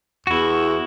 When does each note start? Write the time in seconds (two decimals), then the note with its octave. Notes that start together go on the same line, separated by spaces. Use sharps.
0.27 E2 E4 F#4